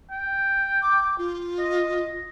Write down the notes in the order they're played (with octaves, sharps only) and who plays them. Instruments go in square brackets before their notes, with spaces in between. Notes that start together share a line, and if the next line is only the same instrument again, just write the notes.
[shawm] G5
[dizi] D6
F4
[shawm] D#5